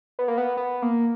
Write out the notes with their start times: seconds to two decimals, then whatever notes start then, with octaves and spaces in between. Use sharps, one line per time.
0.19 B3
0.28 A#3
0.38 B3
0.57 B3
0.82 A#3